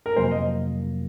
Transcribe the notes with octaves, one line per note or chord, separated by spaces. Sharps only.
A#4
F2 C3 F#3 A#3 C5
D#5